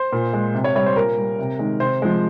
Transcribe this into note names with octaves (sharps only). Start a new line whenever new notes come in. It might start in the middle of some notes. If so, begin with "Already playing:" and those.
Already playing: C5
A#2
G#3
C3
C#5
G3 C#5
C5
A#2 A#4
G3
C3
D#3 G#3
C3 C5
F3 G#3